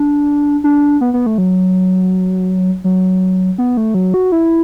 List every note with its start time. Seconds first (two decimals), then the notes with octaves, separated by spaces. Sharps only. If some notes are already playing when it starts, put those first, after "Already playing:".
Already playing: D4
0.64 D4
1.01 B3
1.14 B3
1.26 A3
1.38 F#3
2.84 F#3
3.58 B3
3.77 A3
3.94 F#3
4.14 F#4
4.32 E4